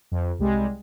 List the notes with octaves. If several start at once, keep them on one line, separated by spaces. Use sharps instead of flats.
F2
C2 G3 G#3